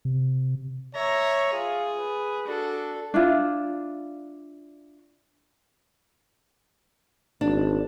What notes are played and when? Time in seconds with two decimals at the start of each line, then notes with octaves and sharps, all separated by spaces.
0.05 C3
0.95 C#5 E5 A#5
1.53 F4 G#4
1.98 B4
2.47 D4 F#4 A4
3.14 D4 E4 F4
7.41 G#1 D4